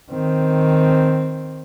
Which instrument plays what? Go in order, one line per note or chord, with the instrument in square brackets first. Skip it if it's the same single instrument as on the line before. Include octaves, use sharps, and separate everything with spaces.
[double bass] D#3 C4